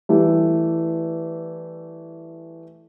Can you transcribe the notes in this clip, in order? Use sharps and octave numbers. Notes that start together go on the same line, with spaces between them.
E3 G3 A3